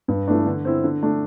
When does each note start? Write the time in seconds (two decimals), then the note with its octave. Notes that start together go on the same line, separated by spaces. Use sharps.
0.08 G2
0.28 E3 A3 D4
0.46 D3
0.65 C4 E4
0.84 D3
1.03 A3 D4